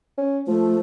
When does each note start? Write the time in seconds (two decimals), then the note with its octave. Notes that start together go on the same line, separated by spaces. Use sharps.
0.17 C#4
0.47 F3 A3